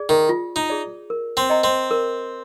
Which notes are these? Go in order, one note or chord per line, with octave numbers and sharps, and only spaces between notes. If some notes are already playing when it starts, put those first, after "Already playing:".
Already playing: G#4 D5
D#3
F4
D#4
G#4 D5
A#4
C4
D#5 G5 A#5
C4
A#4